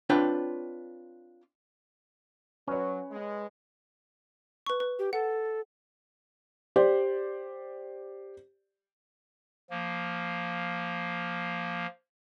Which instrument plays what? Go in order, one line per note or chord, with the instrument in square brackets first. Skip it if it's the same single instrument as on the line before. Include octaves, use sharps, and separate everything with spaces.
[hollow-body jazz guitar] C4 D4 F4 B4 C#5 G5
[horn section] F#3 [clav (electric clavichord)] C#4 [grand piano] B4 C#5
[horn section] G#3
[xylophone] B4 C#6
B4
[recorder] G4
[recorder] A4 [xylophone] F#5
[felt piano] G4 C5 D5
[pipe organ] F3 A#3